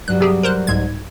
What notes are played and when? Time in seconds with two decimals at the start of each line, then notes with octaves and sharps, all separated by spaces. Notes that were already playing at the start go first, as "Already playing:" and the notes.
0.08 G2 F#3 G3 F#6
0.20 C3 G4 G#4
0.43 A#4 C5 F#6
0.67 C2 G#2 G#6